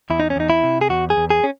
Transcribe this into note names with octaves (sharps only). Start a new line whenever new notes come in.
E2 E4
D#4
C#4
E2 D#4
E4
C3
G#4
E2 F#4
G#4
E2
G#4
C#4